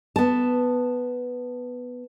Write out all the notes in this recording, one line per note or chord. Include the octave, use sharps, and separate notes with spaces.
B3 A5